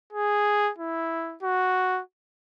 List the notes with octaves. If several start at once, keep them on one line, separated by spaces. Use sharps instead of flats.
G#4
E4
F#4